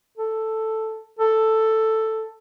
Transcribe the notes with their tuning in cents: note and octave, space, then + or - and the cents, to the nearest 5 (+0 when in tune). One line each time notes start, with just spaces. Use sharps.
A4 +5
A4 +5